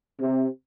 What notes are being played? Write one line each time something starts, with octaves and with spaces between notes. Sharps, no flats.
C3